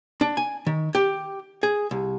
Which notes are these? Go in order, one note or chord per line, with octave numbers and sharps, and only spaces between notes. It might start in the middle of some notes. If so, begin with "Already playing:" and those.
D4
G#5
D#3
G4
G#4
C2